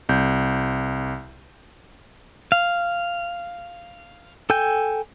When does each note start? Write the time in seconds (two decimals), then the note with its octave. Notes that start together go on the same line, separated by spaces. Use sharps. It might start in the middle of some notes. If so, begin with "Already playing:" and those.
0.09 C2 G6
2.52 F5
4.50 A4 G5 G#5 G6